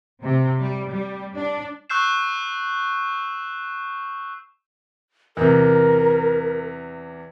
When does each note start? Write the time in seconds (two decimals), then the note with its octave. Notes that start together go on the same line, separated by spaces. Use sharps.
0.22 C3
0.60 G3
0.90 G3
1.36 D4
1.90 C#6 E6 F#6 G6 C7 E7
5.37 E2 C3 A#4